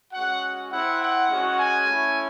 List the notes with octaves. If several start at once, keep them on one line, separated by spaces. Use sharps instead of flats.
G#3 C#4 F#4 F#5
C4 E4 F#5
F#5
G#3 C#4 F#4
G#5
A3 C#4 E4